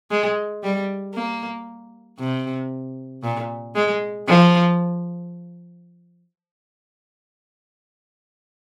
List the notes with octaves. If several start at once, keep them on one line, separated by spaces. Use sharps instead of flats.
G#3
G3
A#3
C3
A#2
G#3
F3